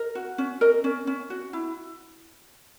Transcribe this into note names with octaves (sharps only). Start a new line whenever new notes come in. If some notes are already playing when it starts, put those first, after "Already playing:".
Already playing: A#4 D#5
F#4
C#4
A#4 D#5
C#4
C#4
F#4
E4